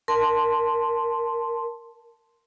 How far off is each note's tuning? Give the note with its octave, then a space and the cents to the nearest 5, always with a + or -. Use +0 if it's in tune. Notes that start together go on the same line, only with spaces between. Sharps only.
A#4 +0 A5 +0 C6 +0